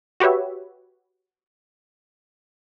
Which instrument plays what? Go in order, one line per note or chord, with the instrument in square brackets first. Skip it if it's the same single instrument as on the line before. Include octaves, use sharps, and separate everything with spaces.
[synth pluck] F#4 G4 B4 C#5 E5